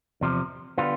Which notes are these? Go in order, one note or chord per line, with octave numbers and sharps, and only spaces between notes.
E2 C3 F3
D3 G3 B3 F4